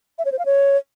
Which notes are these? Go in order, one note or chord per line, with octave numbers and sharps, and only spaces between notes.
E5
C#5
C5
F5
C#5